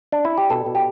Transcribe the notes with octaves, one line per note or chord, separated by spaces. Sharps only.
D4
E4
G4
B2 A4
B2
G4